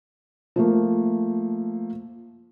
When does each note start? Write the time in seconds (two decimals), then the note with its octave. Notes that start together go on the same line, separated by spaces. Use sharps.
0.56 F3 A3 A#3